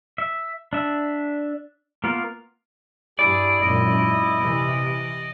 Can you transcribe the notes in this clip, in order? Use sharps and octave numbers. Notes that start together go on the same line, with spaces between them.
E5
D4 E5
A#3 B3 F4 A#4
G2 E4 G#4 D5
G#1 F#2 A#2 D#5
C3 E3